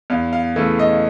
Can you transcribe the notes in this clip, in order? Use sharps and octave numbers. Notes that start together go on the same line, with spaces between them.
E2 F5
F5
C#3 E3 A3
D#5